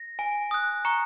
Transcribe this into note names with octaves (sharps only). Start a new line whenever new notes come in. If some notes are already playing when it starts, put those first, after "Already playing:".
Already playing: A#6
G#5
D#6 F#6
A#5 C#6 C#7